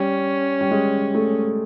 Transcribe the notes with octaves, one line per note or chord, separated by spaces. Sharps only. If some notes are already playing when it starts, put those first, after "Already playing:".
Already playing: G3 C#4
G3
G#3
A3